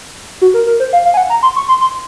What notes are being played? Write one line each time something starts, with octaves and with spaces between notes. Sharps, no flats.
F#4
A#4
A#4
C5
F5
F5
G#5
F#5
A#5
C6
C#6
C6
C6